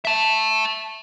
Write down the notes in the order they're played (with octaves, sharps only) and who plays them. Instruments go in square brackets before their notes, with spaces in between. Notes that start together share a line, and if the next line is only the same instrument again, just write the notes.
[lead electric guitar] E5 A5